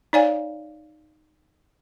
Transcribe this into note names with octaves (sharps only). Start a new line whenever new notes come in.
D#4 C#5 D5 F5 G#5